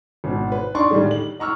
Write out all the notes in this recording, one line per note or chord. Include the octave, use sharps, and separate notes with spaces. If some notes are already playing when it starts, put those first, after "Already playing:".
G#1 B2
B4
D4 D#4 D5 C6 C#6
A2 D3 D#3 G3 G#3
F#7
D#5 A#5 C#6 E6 F6